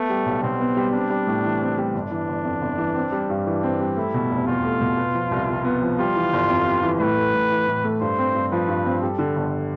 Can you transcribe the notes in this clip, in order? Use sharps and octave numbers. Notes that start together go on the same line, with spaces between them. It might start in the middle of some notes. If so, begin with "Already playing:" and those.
Already playing: A3 B3
G3
B1
B2 C4
B3
G3
C4 D4
G3
A2
E3
C4
G3
G1 D4
E3
G1
F2
G1
E3
C4
G3
G2
E3 D4
C4
G3
A3 E4
B2
F1
E2 F4
A3
B2
B3
F3
C2
C3
B3
F3
G3 F4
E3
G1
F2
G3
E3
A2 B4
A3
A2
E3
A2
A3
G2 C5
C4
G2
F3 B4
G2
C4
G3 A4
D3
G1